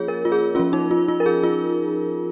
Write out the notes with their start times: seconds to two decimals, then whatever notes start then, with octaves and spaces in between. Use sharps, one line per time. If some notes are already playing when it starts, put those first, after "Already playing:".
Already playing: F3 A#3 C#4 F4 G#4 C#5
0.08 A#4
0.25 F4
0.32 G#4
0.55 F3 C#4 F4
0.73 D#4
0.91 F4
1.08 F4
1.20 A#4
1.26 G#4
1.43 F4